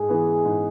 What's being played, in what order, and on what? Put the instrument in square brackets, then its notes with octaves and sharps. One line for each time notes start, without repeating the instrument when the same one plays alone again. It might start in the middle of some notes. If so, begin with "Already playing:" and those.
Already playing: [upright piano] G#2 [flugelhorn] G#4
[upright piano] E3 B3
G#2